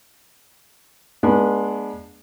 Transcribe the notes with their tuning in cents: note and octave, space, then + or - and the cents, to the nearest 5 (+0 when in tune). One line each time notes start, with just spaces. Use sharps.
G#3 +5 B3 -35 D4 +0